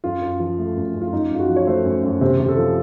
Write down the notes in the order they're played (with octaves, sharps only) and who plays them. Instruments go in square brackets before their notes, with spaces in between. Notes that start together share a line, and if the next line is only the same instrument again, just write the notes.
[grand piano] F#2 F4
F#2
F3
A3
F#2
F#2
F4
F#2 D#4
F#2 F4
F#4
F3
C#5
A3 C5
F#2
F#2
C3 C5
C3
A4
F3